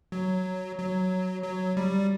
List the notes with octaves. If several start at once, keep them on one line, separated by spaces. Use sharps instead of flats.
F#3
F#3
F#3
G3